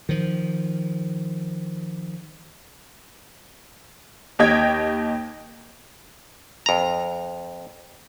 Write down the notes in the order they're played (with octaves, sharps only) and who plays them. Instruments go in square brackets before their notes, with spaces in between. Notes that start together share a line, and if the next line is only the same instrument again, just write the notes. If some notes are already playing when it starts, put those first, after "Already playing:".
[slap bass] D#3 F3
[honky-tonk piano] D#2 G4 D#5 G5 G#6
[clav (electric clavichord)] F2 A#5